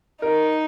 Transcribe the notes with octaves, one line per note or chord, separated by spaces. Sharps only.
D#4 A#4